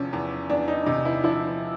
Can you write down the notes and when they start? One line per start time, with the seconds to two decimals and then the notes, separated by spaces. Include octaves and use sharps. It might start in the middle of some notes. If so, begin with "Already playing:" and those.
Already playing: E2 C3 F3 C#4
0.13 E2
0.49 E2 D4
0.68 D#4
0.86 C3 D#4
1.05 E4
1.24 F3 E4